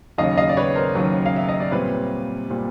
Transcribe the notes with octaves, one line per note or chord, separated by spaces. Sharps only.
D#2 C#3 F#3 D#5 F5
D#5 F5
D5
B4 C#5
A#4 C5
D#2 C#3 F#3
F5
E5
D#5
D5
A#2 G3 C4 B4 C#5
A#2 G3 C4